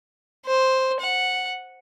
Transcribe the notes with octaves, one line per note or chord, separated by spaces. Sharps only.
C5
F#5